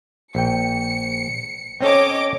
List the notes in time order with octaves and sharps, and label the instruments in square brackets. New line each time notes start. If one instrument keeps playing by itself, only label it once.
[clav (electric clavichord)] A#1 G5 [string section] C#7
[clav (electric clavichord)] C4 C#4 A4 [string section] C#5 D#5 D6